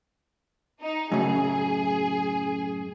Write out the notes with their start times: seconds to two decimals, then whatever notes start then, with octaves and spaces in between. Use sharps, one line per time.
0.81 D#4
1.12 F#2 A2 C#3 G#4